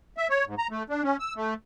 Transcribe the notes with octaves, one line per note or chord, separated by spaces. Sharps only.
E5
C#5
G#2
A#5
A3
D4
C#4
E6
A3